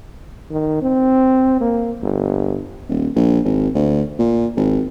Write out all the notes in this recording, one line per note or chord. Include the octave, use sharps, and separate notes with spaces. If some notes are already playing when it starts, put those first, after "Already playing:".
D#3
C4
A#3
G1
D#1
A#1
G#1
D2
A#2
G#1